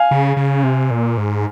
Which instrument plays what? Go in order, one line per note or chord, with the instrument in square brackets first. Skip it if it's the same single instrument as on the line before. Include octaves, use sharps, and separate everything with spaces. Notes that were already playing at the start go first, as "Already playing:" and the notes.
Already playing: [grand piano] F5 G#5
[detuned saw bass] C#3
C#3
C3
A#2
G#2